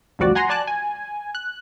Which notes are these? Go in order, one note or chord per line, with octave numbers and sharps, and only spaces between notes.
A1 D2 F3 G3 F#4 D5
F#5 G#5 A#5 C6
D5 G#5 A5 F#6
G#5
F#6